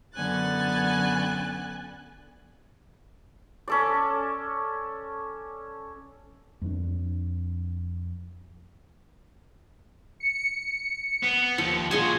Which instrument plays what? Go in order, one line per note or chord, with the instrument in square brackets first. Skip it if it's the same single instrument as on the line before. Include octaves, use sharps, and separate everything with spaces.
[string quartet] F#2 D3 B3 G#5 F#6 A6
[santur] C#4 A4 D5
[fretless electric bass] F2 F3 A3 D4
[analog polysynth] C#7
[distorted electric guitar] B3
[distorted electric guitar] D#2 [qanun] F3
[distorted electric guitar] A#2 F#4 [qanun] F4 G#4 G#5